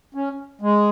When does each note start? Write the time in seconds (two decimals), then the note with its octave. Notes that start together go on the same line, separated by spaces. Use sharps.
0.15 C#4
0.61 G#3